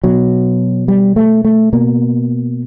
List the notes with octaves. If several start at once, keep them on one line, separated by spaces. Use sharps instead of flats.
B2 F#3
G3
A3
A3
B2 A#3